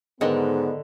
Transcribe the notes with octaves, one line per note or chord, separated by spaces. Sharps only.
G#2 D3 D#3 B3 A#4 D#5 F#5